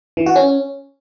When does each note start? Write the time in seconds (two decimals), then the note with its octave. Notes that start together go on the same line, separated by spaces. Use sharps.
0.17 E3
0.26 F#4
0.36 C#4